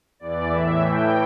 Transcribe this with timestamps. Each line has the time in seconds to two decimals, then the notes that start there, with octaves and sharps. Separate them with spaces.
0.20 E2 E3 D5
0.50 A2 E3 E5
0.81 A2 E3 G5